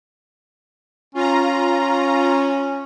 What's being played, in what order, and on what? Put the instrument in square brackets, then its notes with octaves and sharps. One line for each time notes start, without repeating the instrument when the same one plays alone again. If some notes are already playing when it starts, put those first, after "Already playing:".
[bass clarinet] C#4 [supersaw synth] F4 A#5